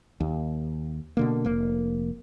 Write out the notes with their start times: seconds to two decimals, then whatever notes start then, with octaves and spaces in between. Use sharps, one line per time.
0.20 D#2
1.17 B2 D3 A#3
1.45 F1 A#3